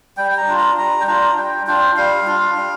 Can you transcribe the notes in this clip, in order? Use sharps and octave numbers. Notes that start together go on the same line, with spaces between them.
G3 G5
G5
A#5
D4 F4
A#5
G3 A#5
G5
D4 F4 A#5
G3 G5
D4 F4 G5
G3 F5
D4 F4
G3